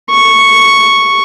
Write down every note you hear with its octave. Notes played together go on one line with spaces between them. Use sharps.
C#6